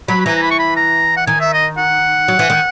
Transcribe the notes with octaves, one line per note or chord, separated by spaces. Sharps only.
F#3 B5
B5
E3 A#5
A#5
B5
C#6
B5
A#5
F#5
D#3 G#5
E5
D#5
F#5
F#3
E3
D#3